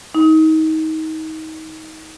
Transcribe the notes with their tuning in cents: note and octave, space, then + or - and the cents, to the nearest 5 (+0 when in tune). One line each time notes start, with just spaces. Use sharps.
D#4 +25